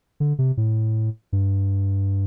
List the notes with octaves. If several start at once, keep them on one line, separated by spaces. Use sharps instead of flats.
D3
C3
A2
G2